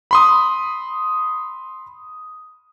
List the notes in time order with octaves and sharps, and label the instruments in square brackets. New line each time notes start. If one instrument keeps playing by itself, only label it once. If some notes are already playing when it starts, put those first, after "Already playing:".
[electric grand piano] B5 C6 D#6